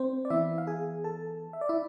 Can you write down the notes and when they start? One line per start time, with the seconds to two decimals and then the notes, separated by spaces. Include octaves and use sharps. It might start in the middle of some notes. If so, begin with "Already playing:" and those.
Already playing: C4 C5
0.25 D5
0.30 E3 B3 E4 E5
0.58 F5
0.67 G#4 G#5
1.04 A4 A5
1.53 E5
1.61 D5
1.69 E4 E5